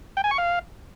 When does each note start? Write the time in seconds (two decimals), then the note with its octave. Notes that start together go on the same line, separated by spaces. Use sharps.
0.17 G5
0.24 G#5
0.31 C#6
0.38 F5